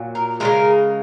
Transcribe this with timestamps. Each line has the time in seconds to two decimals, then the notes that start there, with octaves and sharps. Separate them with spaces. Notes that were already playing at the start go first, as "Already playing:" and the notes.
Already playing: A#2 F#3
0.15 A#4
0.40 C#3 F3 G#3 A#4